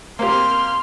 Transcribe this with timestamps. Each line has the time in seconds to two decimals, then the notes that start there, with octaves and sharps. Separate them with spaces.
0.19 A#3 C4 G4 C6 F6